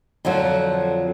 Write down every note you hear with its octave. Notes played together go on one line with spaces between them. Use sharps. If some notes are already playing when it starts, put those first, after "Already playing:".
F2 D3 F3 F#3